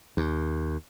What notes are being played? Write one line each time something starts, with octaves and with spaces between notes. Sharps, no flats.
D#2